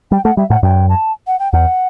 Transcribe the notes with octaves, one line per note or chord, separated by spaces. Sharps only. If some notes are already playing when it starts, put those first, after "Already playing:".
G3 G5
A3 F#5
G3 E5
A2 F#5
F#2 G5
A5
F#5
G5
E2 F#5